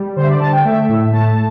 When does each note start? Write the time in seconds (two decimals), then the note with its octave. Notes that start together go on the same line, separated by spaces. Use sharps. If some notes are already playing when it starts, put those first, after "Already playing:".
Already playing: G3
0.16 D3 C5
0.24 E5
0.29 D5
0.40 D3 A5
0.52 G5
0.65 A3 E5
0.89 A2
1.13 A3 A5